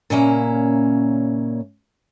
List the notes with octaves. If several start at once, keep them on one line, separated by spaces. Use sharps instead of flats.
A#2 C#3 A#3 C#4 E5 A#5